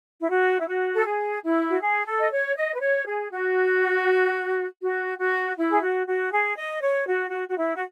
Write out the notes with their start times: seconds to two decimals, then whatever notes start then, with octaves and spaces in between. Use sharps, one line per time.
0.21 E4
0.30 F#4
0.60 E4
0.68 F#4
0.95 A4
1.05 G#4
1.43 E4
1.70 F#4
1.81 G#4
2.06 A4
2.19 D#5
2.31 C#5
2.56 D#5
2.74 B4
2.81 C#5
3.05 G#4
3.31 F#4
4.82 F#4
5.19 F#4
5.56 E4
5.70 G#4
5.81 F#4
6.07 F#4
6.32 G#4
6.57 D#5
6.82 C#5
7.06 F#4
7.31 F#4
7.49 F#4
7.57 E4
7.76 F#4